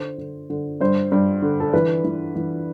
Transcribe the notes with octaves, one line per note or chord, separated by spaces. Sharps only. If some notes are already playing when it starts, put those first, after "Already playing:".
Already playing: D3 C5
D3
D3
G2 C5
G2
D3
A4
E3 B4
E3
E3